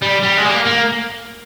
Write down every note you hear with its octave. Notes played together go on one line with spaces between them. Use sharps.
G3
G3
G#3
A#3
A#3